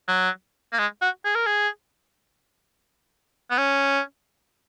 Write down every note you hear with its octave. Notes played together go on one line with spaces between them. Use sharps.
F#3
A#3
G#3
F#4
G#4
A#4
G#4
B3
C#4